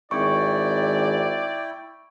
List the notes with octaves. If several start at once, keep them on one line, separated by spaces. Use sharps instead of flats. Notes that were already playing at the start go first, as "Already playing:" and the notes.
G#1 E4 D5 G5 C#6